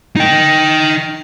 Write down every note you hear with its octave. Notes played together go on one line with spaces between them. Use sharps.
D#4 G5